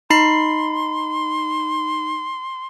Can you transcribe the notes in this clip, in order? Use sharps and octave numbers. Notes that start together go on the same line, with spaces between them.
D#4 B5 C6 C7